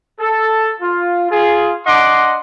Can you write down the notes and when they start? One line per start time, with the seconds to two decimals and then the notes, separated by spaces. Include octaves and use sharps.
0.20 A4
0.81 F4
1.30 F4 G#4
1.86 D4 D#5 F#5 C6 D6